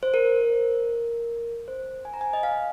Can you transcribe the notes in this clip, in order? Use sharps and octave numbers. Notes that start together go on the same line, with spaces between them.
C5
A#4
C5
G#5
A#5
G#5
D#5
F5